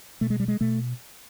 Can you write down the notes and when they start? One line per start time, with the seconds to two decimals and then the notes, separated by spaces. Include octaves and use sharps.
0.21 B2 A3
0.30 G#3
0.40 G3
0.48 G#3
0.61 B2 A3